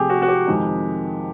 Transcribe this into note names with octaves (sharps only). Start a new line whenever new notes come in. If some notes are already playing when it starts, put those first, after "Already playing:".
Already playing: C3 F3 A3 G4 G#4
F#4
F#4
G4
F2 C3 D#3 G#3